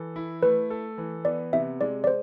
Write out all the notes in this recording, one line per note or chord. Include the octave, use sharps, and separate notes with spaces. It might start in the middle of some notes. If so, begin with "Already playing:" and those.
Already playing: E3 A4
E4
A3 B4
A4
E3
B3 D5
C3 E5
G#3 D5
D5
C5